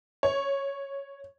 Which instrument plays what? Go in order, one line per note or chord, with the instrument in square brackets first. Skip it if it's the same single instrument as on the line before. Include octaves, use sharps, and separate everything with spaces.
[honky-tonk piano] C#5